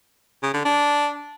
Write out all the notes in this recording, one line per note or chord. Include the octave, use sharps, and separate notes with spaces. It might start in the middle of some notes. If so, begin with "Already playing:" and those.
C#3
D3
D4